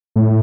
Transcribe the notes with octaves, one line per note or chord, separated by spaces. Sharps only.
A2